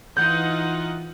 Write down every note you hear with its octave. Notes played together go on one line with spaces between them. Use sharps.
E3 D#4 F4 F#5 G6